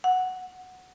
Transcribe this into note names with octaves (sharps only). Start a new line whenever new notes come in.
F#5